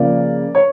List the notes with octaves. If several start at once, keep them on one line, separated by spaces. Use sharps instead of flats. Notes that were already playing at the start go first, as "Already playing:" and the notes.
Already playing: C#3 F3 A#3 D5
C#5